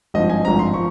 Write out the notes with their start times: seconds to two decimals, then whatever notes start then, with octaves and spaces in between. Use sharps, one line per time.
0.14 G#1 G2 F3 D#5
0.30 G#5
0.45 G#1 G2 F3 A#5
0.59 C6
0.74 F3 C#6